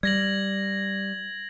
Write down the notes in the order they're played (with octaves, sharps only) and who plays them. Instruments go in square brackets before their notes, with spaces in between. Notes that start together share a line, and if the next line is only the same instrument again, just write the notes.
[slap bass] G3 [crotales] G#6 A#6 F#7